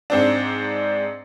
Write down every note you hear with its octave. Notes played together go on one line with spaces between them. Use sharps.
G#2 C4 D4